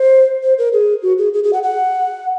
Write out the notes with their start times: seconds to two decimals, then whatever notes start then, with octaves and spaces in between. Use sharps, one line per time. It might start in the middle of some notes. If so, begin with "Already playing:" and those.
Already playing: C5
0.43 C5
0.58 A#4
0.73 G#4
1.03 F#4
1.18 G#4
1.34 G#4
1.44 G#4
1.53 F#5
1.63 F#5